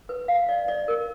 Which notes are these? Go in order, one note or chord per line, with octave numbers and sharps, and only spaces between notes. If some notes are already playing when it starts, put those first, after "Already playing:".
B4
F5
D5
D5
A#4